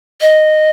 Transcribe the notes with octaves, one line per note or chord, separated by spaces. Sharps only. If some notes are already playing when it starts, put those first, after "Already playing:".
D#5